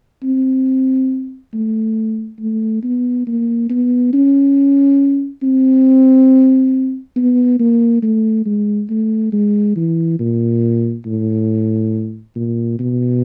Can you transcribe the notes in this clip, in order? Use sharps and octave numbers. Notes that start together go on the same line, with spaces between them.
C4
A3
A3
B3
A#3
B3
C#4
C4
B3
A#3
A3
G#3
A3
G#3
E3
A#2
A2
A#2
B2